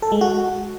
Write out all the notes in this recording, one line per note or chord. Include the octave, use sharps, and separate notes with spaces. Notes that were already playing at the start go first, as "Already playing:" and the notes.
A4
G#3
F#4